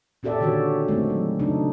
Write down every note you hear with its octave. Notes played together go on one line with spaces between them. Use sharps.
A#2 C#4 G4 A4 D5 E5
D3 D#3 C#4 F#4 C#5
G#3 A3 C4 D#4
F#3
C#3 D4 D#4